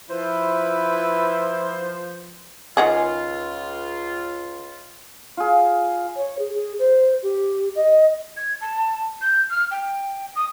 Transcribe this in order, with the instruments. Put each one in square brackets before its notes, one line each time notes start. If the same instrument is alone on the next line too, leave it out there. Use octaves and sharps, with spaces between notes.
[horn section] F3 C5 [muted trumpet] E4 [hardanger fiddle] B4
[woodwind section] C#2 F4 [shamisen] D#3 F#4 G#4
[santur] F4 G#4
[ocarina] C#5
G#4
G#4
C5
G4
D#5
[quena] G#6
A5
G6
F6
G5
D#6